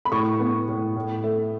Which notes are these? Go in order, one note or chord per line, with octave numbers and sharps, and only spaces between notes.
B5
A2 C#6
B3
A2
A2
A3